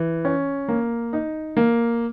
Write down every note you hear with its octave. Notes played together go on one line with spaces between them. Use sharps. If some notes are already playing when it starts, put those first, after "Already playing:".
Already playing: E3
C#4
A#3
D#4
A#3